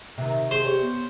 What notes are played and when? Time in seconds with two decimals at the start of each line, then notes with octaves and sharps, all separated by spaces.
0.18 C3 D#3
0.51 G#4 C5
0.66 G4 C#5
0.81 B3